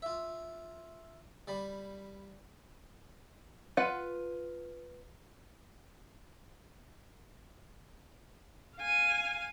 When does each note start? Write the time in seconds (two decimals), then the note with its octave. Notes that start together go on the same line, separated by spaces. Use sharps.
0.02 F4 E5
1.48 G3 D5 B5
3.77 F4 B4 F#5
8.78 F5 G#5